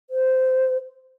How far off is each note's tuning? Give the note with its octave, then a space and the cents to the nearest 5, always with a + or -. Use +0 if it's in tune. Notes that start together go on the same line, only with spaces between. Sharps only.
C5 -10